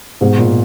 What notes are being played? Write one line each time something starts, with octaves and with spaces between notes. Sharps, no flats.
G#2 B2
A#2